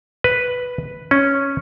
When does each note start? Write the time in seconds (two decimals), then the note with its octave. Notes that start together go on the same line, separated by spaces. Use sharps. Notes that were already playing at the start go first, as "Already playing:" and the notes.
0.24 B4
1.11 C#4